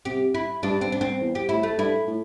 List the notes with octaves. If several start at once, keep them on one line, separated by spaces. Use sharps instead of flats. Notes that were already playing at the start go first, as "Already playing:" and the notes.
C3 G4
E4
G2 D4
C4
D4
C4
E2
G4
A2 E4
A3
G2 E4
A2